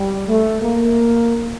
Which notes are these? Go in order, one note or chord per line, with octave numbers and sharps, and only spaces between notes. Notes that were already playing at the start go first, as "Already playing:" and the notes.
Already playing: G3
A3
A#3